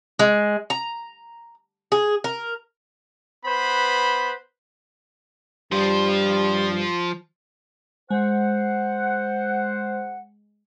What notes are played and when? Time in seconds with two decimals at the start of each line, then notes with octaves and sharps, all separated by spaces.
0.19 G#3
0.70 A#5
1.92 G#4
2.24 A#4
3.46 B3 B4 C5 B5
5.72 G2 F3 C5
8.10 G#3 C5 F#5